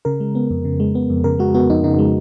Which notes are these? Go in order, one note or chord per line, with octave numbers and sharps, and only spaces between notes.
C#3 A#4
G#3
B3
F2
C#3
G#3
B3
F2
C#3 A#4
G#3 F#4
B3 F#4
F2 D#4
C#3 D#4
G#3